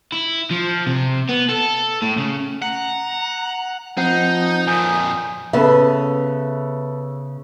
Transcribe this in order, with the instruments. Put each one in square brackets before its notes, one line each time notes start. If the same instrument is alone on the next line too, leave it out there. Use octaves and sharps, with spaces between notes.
[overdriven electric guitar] E4
F3
C3
B3
A4
A2
C#3
[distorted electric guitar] F#5 [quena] A#5
[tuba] F3 [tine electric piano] C4 F#5 C7 [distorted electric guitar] D#4 [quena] G6
[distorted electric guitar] F2 A#2 [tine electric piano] G#5 D#6
[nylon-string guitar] C#3 B3 [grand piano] A4 B4 E5